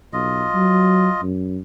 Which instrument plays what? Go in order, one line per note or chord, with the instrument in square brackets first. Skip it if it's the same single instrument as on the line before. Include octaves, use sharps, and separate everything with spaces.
[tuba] B1 [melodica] F4 D#5
[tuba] F#3
F#2